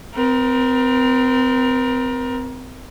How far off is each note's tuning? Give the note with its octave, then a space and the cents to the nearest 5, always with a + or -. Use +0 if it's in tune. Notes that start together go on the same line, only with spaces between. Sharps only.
C4 -25 A#4 +25